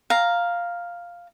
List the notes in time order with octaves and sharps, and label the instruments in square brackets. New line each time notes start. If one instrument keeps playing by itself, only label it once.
[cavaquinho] F5 A#5